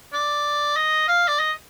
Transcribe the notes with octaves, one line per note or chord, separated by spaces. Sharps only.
D5
D#5
F5
D5
D#5